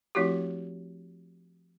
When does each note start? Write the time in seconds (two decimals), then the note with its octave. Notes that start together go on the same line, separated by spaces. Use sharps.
0.15 F3 A3 C4 E4 F#4 G4